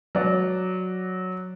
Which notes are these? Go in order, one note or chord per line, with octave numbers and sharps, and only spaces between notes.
F#3 D5